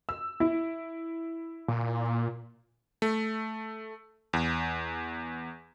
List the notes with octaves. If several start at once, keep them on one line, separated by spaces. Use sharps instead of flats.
E6
E4
A#2
A3
E2